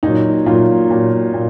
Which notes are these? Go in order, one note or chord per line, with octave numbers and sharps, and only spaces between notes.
A#2 F#3 D#4
A#2 F#3 F4
A#2 F#3
A#2